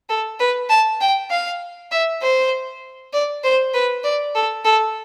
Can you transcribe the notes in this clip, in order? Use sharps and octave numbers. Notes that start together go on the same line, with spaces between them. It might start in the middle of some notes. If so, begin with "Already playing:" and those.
A4
B4
A5
G5
F5
E5
C5
D5
C5
B4
D5
A4
A4